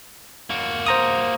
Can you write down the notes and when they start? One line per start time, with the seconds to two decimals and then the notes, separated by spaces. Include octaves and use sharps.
0.50 A#3 F#4
0.86 C5 A#5 D#6